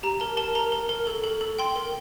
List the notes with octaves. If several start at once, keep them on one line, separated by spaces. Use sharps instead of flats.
G4 A#5
A#4 A5
A#4 A5
A#4 A#5
A#4
A#4
A4
A4
A4
G5 C6
A#4